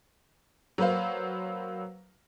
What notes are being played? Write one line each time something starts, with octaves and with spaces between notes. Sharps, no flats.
F#3 A#3 B4 C5 F5